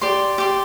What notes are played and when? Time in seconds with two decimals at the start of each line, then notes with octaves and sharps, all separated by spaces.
0.01 G4 D5 C6
0.38 G4 D5 C6